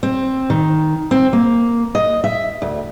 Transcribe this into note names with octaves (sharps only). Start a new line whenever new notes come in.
C4
D#3
C4
A#3
D#5
E5
D2